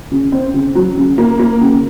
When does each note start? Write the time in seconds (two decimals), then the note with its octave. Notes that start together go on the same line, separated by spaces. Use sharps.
0.11 C#3
0.32 C4
0.54 C#3
0.75 F#3
0.97 C#3
1.18 A#3
1.39 A#3
1.61 C#3